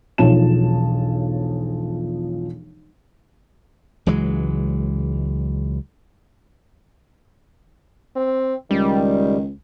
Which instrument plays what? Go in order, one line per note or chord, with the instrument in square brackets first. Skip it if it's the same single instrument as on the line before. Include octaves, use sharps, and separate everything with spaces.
[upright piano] E1 B1 F3 C#5 A5 E7
[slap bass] C#2 E3 F#3 G#3
[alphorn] C4
[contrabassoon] C#2 [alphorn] D#3 [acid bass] G3